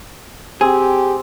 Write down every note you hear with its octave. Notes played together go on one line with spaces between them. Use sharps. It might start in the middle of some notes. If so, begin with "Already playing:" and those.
C4 G4 G#4